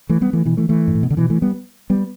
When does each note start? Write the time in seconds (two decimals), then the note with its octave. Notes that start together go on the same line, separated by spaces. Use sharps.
0.09 E3 A3
0.21 G3 B3
0.33 E3 A3
0.45 B2 E3
0.57 E3 A3
0.69 E3 A3
0.88 G2
0.95 A2
1.03 B2
1.10 D3
1.17 B2 E3
1.30 E3 A3
1.42 G3 B3
1.90 G3 B3